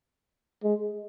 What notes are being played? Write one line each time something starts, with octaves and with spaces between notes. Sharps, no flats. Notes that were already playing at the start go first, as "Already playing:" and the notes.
G#3